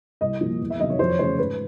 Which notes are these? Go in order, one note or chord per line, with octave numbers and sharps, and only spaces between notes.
C2 D#5
A#2 F3
E2
E5
C3 D#3 F#3 D#5
C#5
F2 C5
C#5
C#3 E3 A3 C5
G#2 B4